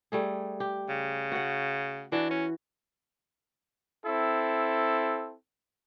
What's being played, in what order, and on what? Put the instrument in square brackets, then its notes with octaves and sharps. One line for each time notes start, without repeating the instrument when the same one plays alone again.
[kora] G3 A3 G#4
G4
[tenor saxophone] C#3
[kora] F#4 F#5
[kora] E3 F#4 [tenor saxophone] D4
[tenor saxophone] C#4
[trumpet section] C4 E4 A4